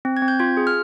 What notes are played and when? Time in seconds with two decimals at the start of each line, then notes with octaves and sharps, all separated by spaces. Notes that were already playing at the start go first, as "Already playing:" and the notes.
0.05 C4
0.17 G#6
0.22 C4
0.28 G6
0.39 F4 G#6
0.57 G#4
0.67 F6